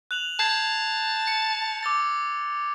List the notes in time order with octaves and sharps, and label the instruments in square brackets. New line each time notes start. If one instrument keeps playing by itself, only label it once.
[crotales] F#6 F7 F#7
[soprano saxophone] A5 [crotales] G6 G#6 C7
[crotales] C#7
D6 E6 A6